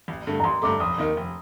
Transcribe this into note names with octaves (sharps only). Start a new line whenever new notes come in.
A1
G2 D3 A3
A#5
A1 C6
G2 D3 A3 D6
F1 D#6
D#2 D#3 A#3 D#4
F1